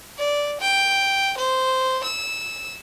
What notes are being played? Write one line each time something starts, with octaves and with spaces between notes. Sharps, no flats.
D5
G5
C5
E6